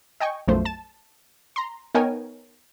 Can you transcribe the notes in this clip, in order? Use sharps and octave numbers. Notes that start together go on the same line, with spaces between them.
D#5 G5 G#5 C#6
B1 F#2 F3 A3 C5
A5 A6 E7
A#5 C6
B3 D#4 A#4 C#5 G5 G#5